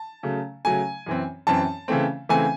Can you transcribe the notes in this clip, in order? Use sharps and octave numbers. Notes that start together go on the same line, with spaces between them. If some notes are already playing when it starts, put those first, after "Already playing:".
Already playing: A5
C#3 F#3 A3
C#3 F#3 A3 G#5
F#2 E3 C4
F#2 E3 C4 A5
C#3 E3 A3 C4
C#3 E3 A3 C4 G#5